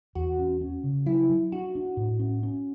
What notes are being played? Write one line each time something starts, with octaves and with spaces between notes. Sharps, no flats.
E2 F#4
C#4
C#4
C#3
F#3 E4
F#3
D4 F#4
D4
A2
C#4
C#4